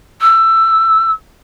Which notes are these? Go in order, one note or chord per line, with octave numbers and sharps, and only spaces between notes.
E6